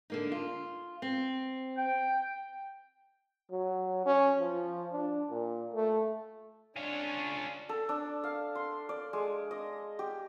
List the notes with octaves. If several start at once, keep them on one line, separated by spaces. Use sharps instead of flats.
D3 A#3 D#4
F4
C4
G5
F#3
C#4
F3
D4
A#2
A3
C#4 D4 F4
A4
D4
F5
C6
D5
G#3
D#5
G4